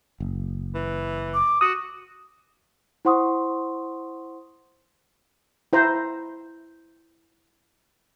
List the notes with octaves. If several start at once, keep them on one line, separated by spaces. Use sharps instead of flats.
F#1
E3
D6
F#4 D#6
E4 C5 F#5 C6 C#6 D#6
E4 C5 A#5